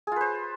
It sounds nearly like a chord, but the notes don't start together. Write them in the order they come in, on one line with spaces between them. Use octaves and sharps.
G#4 F4 B4 C5